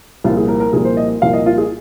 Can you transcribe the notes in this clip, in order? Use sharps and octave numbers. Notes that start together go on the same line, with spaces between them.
C2 A#2 F3 A#3 F4
G#4
A#4
A#4
C2 A#2 F3 A#3 G#4
C5
D#5
C2 A#2 F3 A#3 F5
D#5
F4
G#4